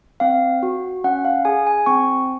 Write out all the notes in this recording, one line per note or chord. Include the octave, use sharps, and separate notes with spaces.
C4 F5
F#4
C#4 F#5
F5
G#4 G#5
G#5
C4 C#6